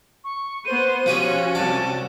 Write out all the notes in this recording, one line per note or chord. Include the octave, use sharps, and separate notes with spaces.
C#6
B3 C5 D#7
F3 C#4 F#4 G4 C#5
C2 D5 A5